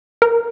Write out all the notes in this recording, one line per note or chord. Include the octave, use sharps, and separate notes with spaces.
A#4